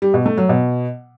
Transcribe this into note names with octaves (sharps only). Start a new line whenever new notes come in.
G3
B2
A3
F#3
B2